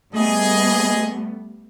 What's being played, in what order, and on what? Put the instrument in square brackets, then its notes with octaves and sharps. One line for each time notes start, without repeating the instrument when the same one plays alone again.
[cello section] G3 A3 B3 [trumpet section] G#4 D#5